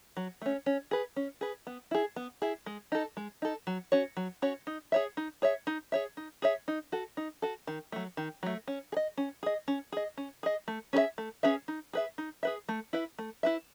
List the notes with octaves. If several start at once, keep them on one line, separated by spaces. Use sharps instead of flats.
F#3
A3 C#4
C#4
G#4 B4
C#4
G#4 B4
B3
E4 G#4
B3
E4 G#4
G#3
D#4 A4
G#3
D#4 A4
F#3
C#4 F#4 C#5
F#3
C#4 F#4 C#5
D#4
G#4 C#5 E5
D#4
G#4 C#5 E5
D#4
G#4 C#5 E5
D#4
G#4 C#5 E5
D#4
F#4 A4
D#4
F#4 A4
D#3
F#3 A3
D#3
F#3 A3
C#4
G#4
D#5
C#4
G#4 D#5
C#4
G#4 D#5
C#4
G#4 D#5
A3
C#4 G#4 B4 E5
A3
C#4 G#4 B4 E5
D#4
G#4 B4 E5
D#4
G#4 B4 E5
A3
E4 B4 E5
A3
E4 B4 E5